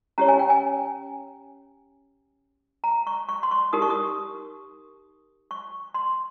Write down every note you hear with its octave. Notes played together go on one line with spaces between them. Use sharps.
C#4 G4 C#5 A#5
G#5
G5
G#5
A#5
C#6
C#6
C6
C#6
D#4 G4 A#4 D#6
C#6
D#6
C#6
C6